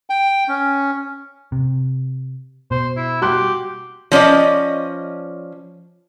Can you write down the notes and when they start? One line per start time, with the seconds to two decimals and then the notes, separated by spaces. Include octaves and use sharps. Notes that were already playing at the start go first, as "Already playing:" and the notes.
0.10 G5
0.48 C#4
1.52 C3
2.71 B2 C5
2.96 E4
3.22 F#4 G4 C6 F#6
4.12 F3 C#4 D5 D#5